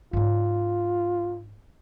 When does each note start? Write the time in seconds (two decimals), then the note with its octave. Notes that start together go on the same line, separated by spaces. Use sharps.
0.13 G#2 D4 F4